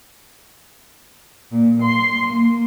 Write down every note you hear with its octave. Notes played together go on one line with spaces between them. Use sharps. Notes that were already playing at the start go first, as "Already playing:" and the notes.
A#2
C6
A#3